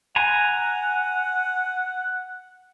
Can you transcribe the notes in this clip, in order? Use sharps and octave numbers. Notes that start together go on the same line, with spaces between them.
F#5 G#5 A#5